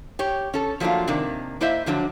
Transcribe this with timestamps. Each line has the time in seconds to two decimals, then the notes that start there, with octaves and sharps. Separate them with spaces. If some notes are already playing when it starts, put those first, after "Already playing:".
0.19 G4 C#5
0.54 C#4 A4
0.80 F3 F#3 A3 A#3 D4 F4
1.08 C3 D#3 A#3 D4
1.61 A#3 E4 C5 D#5 E5
1.86 D3 F3 F#3 D4